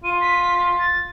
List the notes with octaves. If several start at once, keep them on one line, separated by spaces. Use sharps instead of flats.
F4 D#7
B6
A6